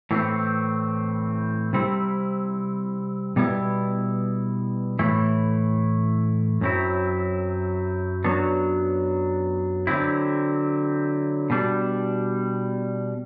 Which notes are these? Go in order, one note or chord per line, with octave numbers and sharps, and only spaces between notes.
A2 E3 A3 C4
C3 G3 C4 E4
B2 G3 B3 E4
A2 E3 A3 E4
F#2 F#3 C4 E4
F#2 F#3 B3 D4
D3 F#3 C4 E4
B2 G3 D4